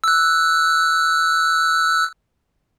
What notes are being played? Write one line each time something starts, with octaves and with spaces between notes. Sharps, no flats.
E6 F#6